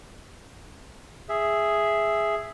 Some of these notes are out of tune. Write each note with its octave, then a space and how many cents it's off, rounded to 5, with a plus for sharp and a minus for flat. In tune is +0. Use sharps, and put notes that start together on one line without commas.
G#4 +0 E5 +0